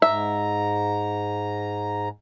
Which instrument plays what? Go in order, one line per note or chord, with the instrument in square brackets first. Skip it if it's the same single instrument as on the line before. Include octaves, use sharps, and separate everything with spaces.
[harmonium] G#2 A#5 [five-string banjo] E5